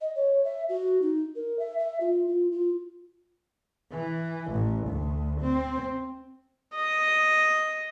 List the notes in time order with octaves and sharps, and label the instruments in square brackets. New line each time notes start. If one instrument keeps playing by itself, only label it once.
[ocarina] D#5
C#5
E5
F#4
D#4
A#4
E5
E5
F4
F4
F4
[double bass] E3
A1
D2
C4
[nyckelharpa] D#5